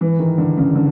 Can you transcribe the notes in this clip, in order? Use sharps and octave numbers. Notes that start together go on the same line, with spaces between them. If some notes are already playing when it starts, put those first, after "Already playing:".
E3
D#3
D3
C#3
D3